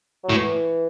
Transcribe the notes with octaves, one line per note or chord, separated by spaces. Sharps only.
F#3
A2
E3